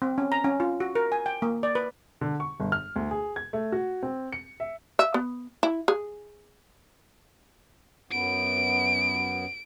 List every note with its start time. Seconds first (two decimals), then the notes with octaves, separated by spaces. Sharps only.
0.02 C4
0.18 C#4
0.32 A#5
0.44 C#4
0.60 F4
0.80 F#4
0.95 A#4
1.12 G#5
1.26 G5
1.42 A#3
1.63 D5
1.75 B4
2.21 D3
2.40 C#6
2.60 G1
2.72 F6
2.96 D2
3.11 G#4
3.36 G#6
3.53 A3
3.72 F#4
4.03 C4
4.32 C#7
4.60 E5
4.99 E5
5.14 B3
5.63 E4
5.88 G#4
8.12 F#2 B3 D7